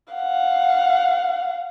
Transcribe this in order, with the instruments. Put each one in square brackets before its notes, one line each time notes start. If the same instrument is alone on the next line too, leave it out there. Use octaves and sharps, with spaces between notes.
[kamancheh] F5 F#5